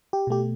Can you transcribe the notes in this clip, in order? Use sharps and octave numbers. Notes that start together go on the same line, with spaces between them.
G4
B2 A3 G4